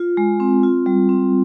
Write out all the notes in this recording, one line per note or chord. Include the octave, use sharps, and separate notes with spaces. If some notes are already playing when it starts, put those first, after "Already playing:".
Already playing: F4
G#3
C4
F4
G3
C4